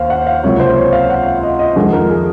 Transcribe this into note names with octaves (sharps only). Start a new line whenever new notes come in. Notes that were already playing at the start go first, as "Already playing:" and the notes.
Already playing: D#2 C5 F5
F#5
F5
C#2 C3 F#3 A#3 C#5
C5
C#5
F5
F#5
F5
D#5
D#5
F2 D#3 G#3
A#4
G#4